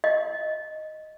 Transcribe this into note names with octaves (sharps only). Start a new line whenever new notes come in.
D#5